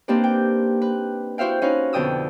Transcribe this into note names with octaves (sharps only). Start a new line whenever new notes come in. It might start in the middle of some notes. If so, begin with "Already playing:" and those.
A#3 C4 D4 D#4 G4 B4
G5
B4
E4 F#4 C5 E5 F5 G5
C#4 D#4 F#4 B4 F5
F2 B2 D3 G5 D#6 E6